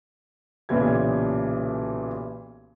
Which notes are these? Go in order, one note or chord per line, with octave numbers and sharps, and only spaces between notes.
B1 A#2 C#3 E3 G4 G#6